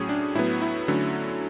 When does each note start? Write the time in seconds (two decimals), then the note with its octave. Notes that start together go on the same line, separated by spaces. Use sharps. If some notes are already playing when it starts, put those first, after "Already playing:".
Already playing: A2 F#3 C#4 G#4
0.09 D4
0.35 A2 F#3 B3 E4
0.62 E4
0.88 D3 F#3 A3 C#4